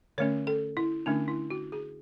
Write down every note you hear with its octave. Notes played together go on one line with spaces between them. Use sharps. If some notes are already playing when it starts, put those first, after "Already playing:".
D3 A3 C#4 C#5
A4
E4
D3 A3 C#4 D4
E4
F#4
G#4